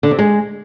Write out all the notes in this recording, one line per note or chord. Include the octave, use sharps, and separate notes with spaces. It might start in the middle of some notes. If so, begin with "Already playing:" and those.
D3
C3
G#3